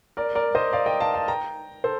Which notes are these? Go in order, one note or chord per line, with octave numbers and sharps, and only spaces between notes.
A#4 D5
A#4 D5
C5 D#5
D5 F5
D#5 G5
F5 A5
F5 A5
G5 A#5
A4 C5